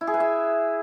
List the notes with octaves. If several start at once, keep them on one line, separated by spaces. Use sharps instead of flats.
E4
G#4
B4
E5